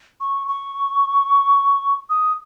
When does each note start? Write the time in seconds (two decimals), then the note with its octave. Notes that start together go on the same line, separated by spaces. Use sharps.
0.21 C#6
0.48 C#6
2.10 D#6